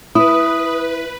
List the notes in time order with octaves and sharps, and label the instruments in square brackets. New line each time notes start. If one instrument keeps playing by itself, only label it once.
[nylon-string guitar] E4 [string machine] B4 [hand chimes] D#6